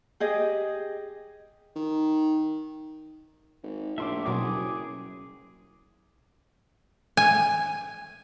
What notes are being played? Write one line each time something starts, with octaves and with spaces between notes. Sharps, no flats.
G4 G#4 D#5
D#3
G#1
A#1 A2 E5 C6 D6
F#1 B2 F#3 G3 G#4 D6
G#5